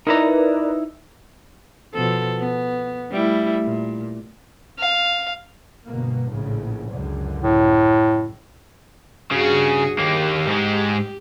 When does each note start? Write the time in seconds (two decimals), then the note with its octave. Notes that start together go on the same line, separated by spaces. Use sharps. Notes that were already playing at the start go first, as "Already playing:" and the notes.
0.07 D#4 E4 A#4 B4 D5 A#5
1.94 B2 F3 A4
2.39 B3
3.11 G3 A3 E4
3.63 A#2
4.79 F5
5.86 G1 B2 A#3
6.32 A#1 A2 C#3
6.93 C#2 F#2 D3
7.43 A2
9.31 G2 C#3 F#4 G#4
9.99 D#2 A#3 G4
10.47 G#2 G#3